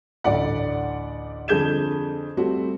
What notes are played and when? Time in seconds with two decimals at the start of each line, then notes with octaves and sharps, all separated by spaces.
0.24 A1 D2 D5 F#5
1.48 F2 D3 G#4 G6 G#6 E7
2.37 G3 A3 C4 F#4